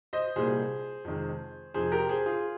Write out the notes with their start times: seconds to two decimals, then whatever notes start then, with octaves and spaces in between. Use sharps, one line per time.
0.13 C5 D#5
0.36 C2 A#2 G3 A#3 G#4 C5
1.05 F2 C3 D#3 G#3
1.74 F2 C3 F3 G#4 C5
1.92 G4 A#4
2.09 G#4 C5
2.26 F4 G#4